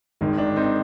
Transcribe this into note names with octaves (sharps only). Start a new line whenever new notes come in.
G#1 G#2 D#3
D4
C4 D#4